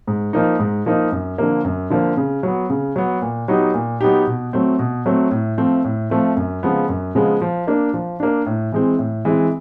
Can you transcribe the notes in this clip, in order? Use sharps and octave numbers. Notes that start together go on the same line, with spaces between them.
G#2
F3 A#3 D#4
G#2
F3 A#3 D#4
F#2
D3 F3 A#3
F#2
D3 F3 A#3
C#3
F#3 B3
C#3
F#3 B3
A#2
F#3 B3 D#4 G4
A#2
F#3 B3 D#4 G4
B2
F#3 A3 C4
B2
F#3 A3 C4
A2
F3 A3 C4
A2
F3 A3 C4
F#2
C#3 F3 G#3 B3
F#2
C#3 F3 G#3 B3
F3
A#3 D4
F3
A#3 D4
A2
E3 G#3 C4
A2
E3 G#3 C4